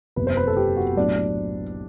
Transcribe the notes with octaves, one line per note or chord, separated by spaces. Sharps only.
F#1 E2 C3 B4
C5
B4
A4
G4
F#4
B1 A2 F#3 D4